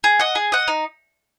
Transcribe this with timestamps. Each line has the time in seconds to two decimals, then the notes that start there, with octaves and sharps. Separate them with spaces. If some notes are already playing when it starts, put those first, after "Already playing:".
0.04 G#4
0.19 D#5 F#5
0.35 G#4
0.52 D#5 F#5
0.68 D#4